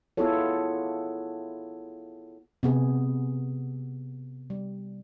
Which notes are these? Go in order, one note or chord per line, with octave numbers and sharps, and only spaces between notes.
B3 E4 F4 G#4 A4 C#5
C3 B3 G#4
G3